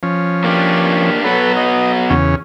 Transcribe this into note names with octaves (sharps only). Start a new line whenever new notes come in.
F3 C#4
A#3 D4 G4
F#3 B3 A4 B4 C#5
D#5
E2 C#3 C#4